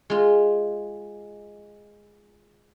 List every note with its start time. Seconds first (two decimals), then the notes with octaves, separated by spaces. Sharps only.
0.10 G#3 F4